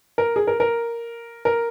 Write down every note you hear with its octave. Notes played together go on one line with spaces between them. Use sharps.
A#4
G#4
A#4
A#4
A#4